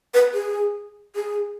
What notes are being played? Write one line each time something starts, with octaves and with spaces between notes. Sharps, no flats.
B4
G#4
G#4